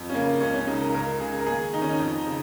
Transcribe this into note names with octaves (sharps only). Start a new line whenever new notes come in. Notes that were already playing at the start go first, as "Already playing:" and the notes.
Already playing: F2
C#4
C#3 A#3
C#2 C#4
C#4
C#3 D#4
A#4
C#2 A#4
C#3 G#4
A#4
D#2 G#4
D#3 D#4
C#4
D#4
F2
C#3